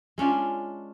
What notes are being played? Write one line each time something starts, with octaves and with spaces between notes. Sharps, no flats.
G#3 C#4 D4 F4